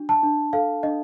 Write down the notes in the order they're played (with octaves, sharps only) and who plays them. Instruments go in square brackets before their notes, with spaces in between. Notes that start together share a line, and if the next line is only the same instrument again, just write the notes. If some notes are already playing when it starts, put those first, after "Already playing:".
Already playing: [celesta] D4 F#4
A5
D4
A4 F5
D4 D#5